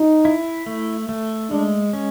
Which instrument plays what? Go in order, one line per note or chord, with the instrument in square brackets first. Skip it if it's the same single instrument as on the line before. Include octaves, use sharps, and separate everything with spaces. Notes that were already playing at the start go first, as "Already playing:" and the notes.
Already playing: [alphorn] D#4
[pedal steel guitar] E4
A3
A3
[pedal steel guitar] G#3 [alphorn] D4
[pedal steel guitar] C#4